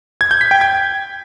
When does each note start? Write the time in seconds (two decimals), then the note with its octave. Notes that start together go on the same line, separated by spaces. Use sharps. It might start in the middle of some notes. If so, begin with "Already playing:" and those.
0.21 G#6
0.31 G6
0.41 B6
0.51 G5
0.61 G#6